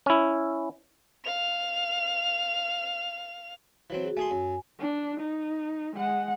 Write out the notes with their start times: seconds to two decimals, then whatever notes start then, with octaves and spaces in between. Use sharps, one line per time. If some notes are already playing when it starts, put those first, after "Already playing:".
0.06 C#4 E4
1.24 F5 F7
3.90 E3 F#3 C4
4.03 F#4 G#4
4.17 A3 G#4 G#5 C6
4.31 F#2
4.80 D4
5.20 D#4
5.96 G#3 F#5